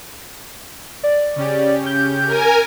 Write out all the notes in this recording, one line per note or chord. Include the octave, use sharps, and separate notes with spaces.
D5
C#3 C#4 G4
G6
A#4 G#5